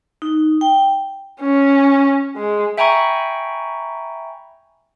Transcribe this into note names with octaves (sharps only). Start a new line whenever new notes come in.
D#4
G5
C#4
G#3
E5 G5 G#5 A#5 B5 C#6